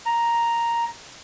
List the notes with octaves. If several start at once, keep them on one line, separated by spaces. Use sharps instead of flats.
A#5